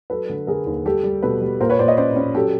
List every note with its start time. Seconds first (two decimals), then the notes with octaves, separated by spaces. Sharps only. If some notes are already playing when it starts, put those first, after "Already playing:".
0.10 F#3 A4 B4
0.29 D3
0.47 D3 G#4 A#4
0.66 D#2
0.85 G3 G4 A4
1.04 G3
1.23 B2 A4 B4
1.42 G3
1.61 A#2 A#4 C5
1.70 B4 C#5
1.79 A#2 C5 D5
1.88 C#5 D#5
1.97 C#4 C5 D5
2.16 C#4
2.35 F#3 G4 A4